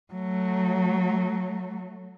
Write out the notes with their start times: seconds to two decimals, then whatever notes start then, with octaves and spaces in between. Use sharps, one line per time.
0.13 F#3 A3